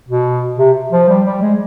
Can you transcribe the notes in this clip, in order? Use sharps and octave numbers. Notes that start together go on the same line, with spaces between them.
B2
C3
F3
G3
G3
G#3